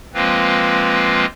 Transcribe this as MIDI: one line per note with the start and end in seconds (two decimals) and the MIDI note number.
0.14 1.26 53
0.14 1.26 56
0.14 1.26 58
0.14 1.26 60
0.14 1.26 65
0.14 1.26 71